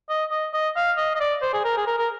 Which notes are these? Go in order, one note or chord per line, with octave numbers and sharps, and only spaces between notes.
D#5
D#5
D#5
F5
D#5
D#5
D5
C5
G#4
A#4
G#4
A#4
A#4